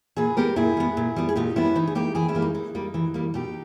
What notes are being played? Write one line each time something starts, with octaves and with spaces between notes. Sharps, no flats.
A#2 G#4 B4
G3 B3 G4 A#4
A#2 E4 G#4
G3 B3
A#2
G3 B3
G#4
A#2 D#4 G4
G3 B3 C#4 E4
E3 D#4
G#4
G3 A#3 D#4 G4
E3 E4 G#4
C#4 E4
G3 A#3
D#4
E3 D#4
G3 A#3
E3
G3 A#3
B2 D#4 G4